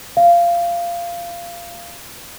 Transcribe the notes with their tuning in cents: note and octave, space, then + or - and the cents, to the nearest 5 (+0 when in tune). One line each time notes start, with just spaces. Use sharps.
F5 -15